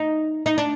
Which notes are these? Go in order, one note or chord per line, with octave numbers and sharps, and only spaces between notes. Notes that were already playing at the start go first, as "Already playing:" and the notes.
Already playing: D#4
D#4
D4